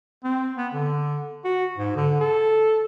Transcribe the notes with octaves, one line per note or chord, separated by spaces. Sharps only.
C4
B3
D3
F#4
G#2
D3
A4